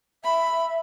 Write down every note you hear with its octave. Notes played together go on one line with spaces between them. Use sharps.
E5 B5